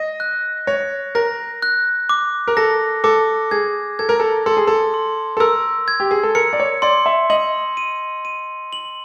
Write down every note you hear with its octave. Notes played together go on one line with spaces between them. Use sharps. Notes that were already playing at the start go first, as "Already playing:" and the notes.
Already playing: D#5 A#6
F#6
C#5 A#6
A#4 A#6
F#6
D6
A#4
A4 A#6
A4 D6
G#4 G#6
A4 G#6
A#4
A4
A4 C6
G#4
A4
C6
A4
A#4 E6
G#6
G4
G#4
A4
A#4 C#7
D5
C#5
D5 C6
E5
D#5 F#7
D#7
D#7
F#7